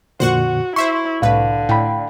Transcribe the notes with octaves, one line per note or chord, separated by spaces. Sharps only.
F2 A#2 D3 F#4 C5 F#5 C#6
E4 C5 E5 C6 C#6
C2 A2 D3 B4 F5
A2 G5 B5